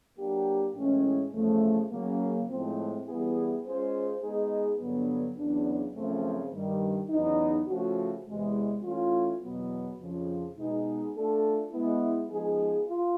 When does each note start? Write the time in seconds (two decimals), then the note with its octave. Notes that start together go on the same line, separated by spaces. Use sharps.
0.17 F#3 A#3 D4 G4
0.76 A2 E3 G#3 C#4
1.33 E2 C#3 F3 A3
1.90 C#3 F#3 A#3
2.49 A2 F3 G#3 C4
3.06 E3 G3 B3 E4 G#4
3.64 G#3 C#4 F4 G#4 C5
4.21 G#3 B3 D#4 G#4
4.79 G2 D3 F#3 B3
5.36 E2 C#3 F#3 B3 D4
5.95 F#2 C#3 F3 A3 C4
6.53 G2 D#3 G3
7.10 E2 C#3 F#3 B3 D#4
7.67 C#3 F3 A3 C#4 F#4
8.26 E2 C3 E3 G#3
8.83 E3 A3 C#4 F4
9.41 E2 B2 F#3 B3
9.99 F2 C#3 F3
10.56 B2 G#3 B3 D#4 G#4
11.14 A3 D4 F4 A4
11.72 G#3 B3 E4
12.29 F3 G#3 B3 D#4 G#4
12.87 F4